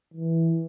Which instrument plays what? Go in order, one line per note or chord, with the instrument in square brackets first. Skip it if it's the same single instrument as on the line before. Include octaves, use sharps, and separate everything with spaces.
[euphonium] E3